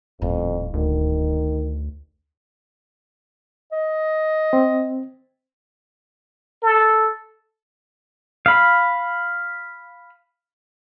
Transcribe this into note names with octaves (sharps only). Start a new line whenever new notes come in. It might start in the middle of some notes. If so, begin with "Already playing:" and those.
D#1 F2 A2
D2 D#3
D#5
C4
A4
F5 B5